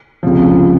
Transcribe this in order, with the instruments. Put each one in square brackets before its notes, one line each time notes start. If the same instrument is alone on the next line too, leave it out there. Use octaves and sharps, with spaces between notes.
[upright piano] C#2 C3 F3